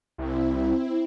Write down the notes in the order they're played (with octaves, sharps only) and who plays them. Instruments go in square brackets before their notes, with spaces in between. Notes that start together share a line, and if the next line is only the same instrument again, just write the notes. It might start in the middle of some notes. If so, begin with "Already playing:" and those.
[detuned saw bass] C2 [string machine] C4 E4